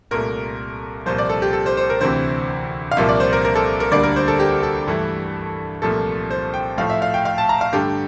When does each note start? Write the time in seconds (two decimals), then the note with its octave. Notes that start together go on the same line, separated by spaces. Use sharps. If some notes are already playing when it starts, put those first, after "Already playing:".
0.11 C2 A#2 A3 A#4
1.06 C2 A#2 F3 C5
1.18 D5
1.30 A4
1.42 G4
1.53 A4
1.66 C5
1.77 C5
1.90 A#4
2.01 D2 C3 E3 C5
2.91 F5
2.97 C2 A#2 F3 A#3 E5
3.09 D5
3.20 C5
3.33 A#4
3.45 A#4
3.56 A4
3.80 A#4
3.91 D2 D3 G3 A#3 D5
4.03 A#4
4.16 C5
4.28 A4
4.39 G4
4.63 A4
4.87 G2 E3 A3
5.82 C2 A#2 F3 A3 A4
6.31 C5
6.54 G5
6.78 A2 F3 A3 F5
6.90 E5
7.02 F5
7.14 G5
7.25 F5
7.38 A5
7.49 A#5
7.61 F5
7.73 G2 D3 A3 G4